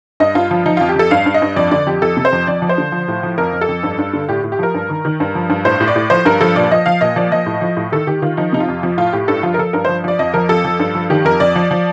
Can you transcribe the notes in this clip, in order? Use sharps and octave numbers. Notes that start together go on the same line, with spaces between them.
G2 D#5
G2 F4
F3 F4
F3 D#4
F2 F4
G4
F2 A4
G2 F5
G2
D#5
G2
F2 D5
D3 D5
F2 G4
F2 A4
C3
C5
F2
F2 D5
F3
C5
D3
F3
A2
F3
F2 A#4
F2
A4
F2
G2
G2
D3
A2 G4
A2
G4
F3 A#4
G2
D#3
D#3
G2
F3
G2
A2 C5
A2
D5
A2
F3 C5
G2 A#4
F3 A4
A#2 D5
F3 D#5
F3 F5
A#2 D#5
F3 D5
F3 D#5
A2
F3
A2
D#3 A4
D#3 G4
D#3 F4
F3 D#4
C3 D#4
F4
F2
F3 F4
A2 F4
A2 G4
G2 A4
F3 F4
A#4
F3 A4
G2 A#4
F3 C5
F3 D5
F2 D#5
F3 A#4
F2 A4
F3
G2
F3
D#3 G4
F2 A#4
F2 D5
F3
F3